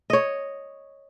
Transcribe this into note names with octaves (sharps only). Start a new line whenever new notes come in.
C#5 D#5